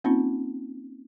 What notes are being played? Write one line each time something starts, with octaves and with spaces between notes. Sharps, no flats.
A#3 C4 C#4 D#4 F4